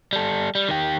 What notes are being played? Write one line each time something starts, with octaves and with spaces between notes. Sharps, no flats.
G3 A4
G3
D#3 G4